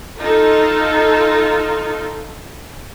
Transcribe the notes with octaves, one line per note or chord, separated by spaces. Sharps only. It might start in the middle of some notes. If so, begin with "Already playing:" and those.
D#4 F4 A4